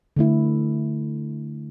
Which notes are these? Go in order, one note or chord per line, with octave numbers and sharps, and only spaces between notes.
D3 A3 E4